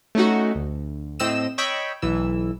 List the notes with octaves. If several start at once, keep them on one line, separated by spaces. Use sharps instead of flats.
A3 C#4 D#4 F#4
D2
A2 C4 D#5 E6 E7
C#5 D#5 G5 B5 E6
B1 E3 E6